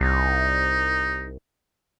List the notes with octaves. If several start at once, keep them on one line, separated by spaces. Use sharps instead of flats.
C2 D#4